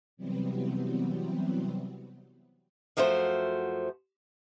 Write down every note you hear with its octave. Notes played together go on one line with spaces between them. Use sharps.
C3 E3 F#3 G3 B3 C4
F#2 F3 A3 F#4 C5